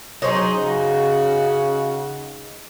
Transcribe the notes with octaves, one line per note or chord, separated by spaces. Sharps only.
F#3 D#4 G#4 C5 C#5 D#5
C#3 C#4 F#4